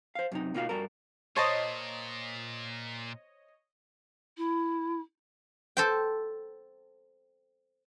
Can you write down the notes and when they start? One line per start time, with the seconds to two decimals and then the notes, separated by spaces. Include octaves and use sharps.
0.15 C5 F5
0.32 F#2 C3 D#4
0.54 B2 A#3 D#4 F4 F#4 F5
0.69 G2 F#4 A4 A#4
1.36 A#2 C5 C#5 D#5 A5
4.37 E4
5.77 A4 C5 G5